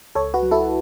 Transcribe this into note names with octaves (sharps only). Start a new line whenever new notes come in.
C#2 A4 C#5
F#4 B4
F#3
E4 A4